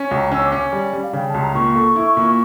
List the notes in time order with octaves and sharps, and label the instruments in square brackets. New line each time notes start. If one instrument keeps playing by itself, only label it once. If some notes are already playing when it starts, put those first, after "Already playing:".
Already playing: [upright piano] C#4
C#2
[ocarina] A#5
[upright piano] C#4 [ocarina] E6
[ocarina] D6
[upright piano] C#4
G3
G3
[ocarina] F5
[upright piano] C#3 [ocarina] G5
[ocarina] A5
[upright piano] C#2
[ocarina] A#5
[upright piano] A#2 [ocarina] C#6
[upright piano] A4
E4
A#2